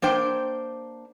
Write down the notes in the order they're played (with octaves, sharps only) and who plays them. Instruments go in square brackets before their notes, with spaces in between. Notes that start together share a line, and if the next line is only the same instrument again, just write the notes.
[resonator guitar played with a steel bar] A#3 D4 C5 G5